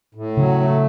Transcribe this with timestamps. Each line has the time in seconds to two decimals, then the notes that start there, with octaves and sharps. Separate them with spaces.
0.15 A2
0.37 C#3 F#3
0.60 A3